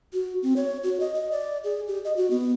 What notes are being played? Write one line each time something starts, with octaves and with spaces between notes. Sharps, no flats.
F#4
C4
C#5
F#4
D#5
D#5
D5
G#4
G4
D#5
F#4
B3